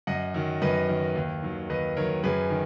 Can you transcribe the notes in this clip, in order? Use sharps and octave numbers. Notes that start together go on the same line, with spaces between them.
F#2 D#5 F#5
D#3 F#3
F#2 B4 D#5
D#3 F#3
D#2
D#3 F#3
D#2 B4 D#5
D#3 F#3 A#4 C#5
F#2 G#4 B4
D#3